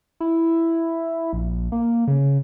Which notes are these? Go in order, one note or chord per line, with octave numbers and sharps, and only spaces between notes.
E4
A#1
A#3
C#3